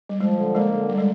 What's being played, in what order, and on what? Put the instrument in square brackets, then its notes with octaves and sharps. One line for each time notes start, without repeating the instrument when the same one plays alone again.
[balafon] G3
[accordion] F3 [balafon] G#3
[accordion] D3
[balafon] G#3 [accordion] A#3
[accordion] D3
[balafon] G3
G#3